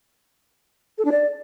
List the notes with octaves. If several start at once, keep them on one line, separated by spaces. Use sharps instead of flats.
A4
D4
D5